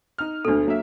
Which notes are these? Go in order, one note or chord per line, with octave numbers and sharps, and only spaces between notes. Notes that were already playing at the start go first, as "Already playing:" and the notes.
D#4 F6
D2 B2 D4 A4
F#3 A#3 E5